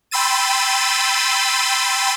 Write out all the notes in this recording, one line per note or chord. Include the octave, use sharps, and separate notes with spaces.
G5 B5 C6 E6 A6 D#7